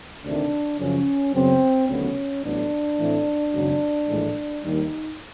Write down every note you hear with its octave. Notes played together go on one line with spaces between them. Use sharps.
D2 C3 D#3 D4
F#2 C#3 F3 C#4
F#2 C#3 F#3 B3 C4
D2 C3 D#3 F#3 B3 C#4
A1 A2 F#3 B3 D4
A2 E3 A3 C4
G#1 F#2 C#3 F#3
A#1 A2 E3 G#3
D#2 D#3 G3 D#4